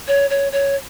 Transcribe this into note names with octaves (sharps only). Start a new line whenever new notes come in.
C#5
C#5
C#5